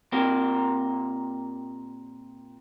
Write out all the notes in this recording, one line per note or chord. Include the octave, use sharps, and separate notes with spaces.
A#2 C4 G4 A#4 A#5